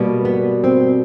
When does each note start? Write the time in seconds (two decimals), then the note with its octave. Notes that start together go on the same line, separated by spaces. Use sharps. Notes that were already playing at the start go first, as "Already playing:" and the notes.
Already playing: B2 G3 A#3
0.25 B3
0.64 C4